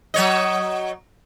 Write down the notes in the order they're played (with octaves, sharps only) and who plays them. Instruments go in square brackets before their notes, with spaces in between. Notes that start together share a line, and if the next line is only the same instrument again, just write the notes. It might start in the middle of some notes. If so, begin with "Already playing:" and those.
[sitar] F#3 C#5 D#5